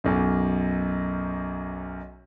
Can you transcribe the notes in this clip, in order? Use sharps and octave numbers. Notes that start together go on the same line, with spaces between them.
B1 F#2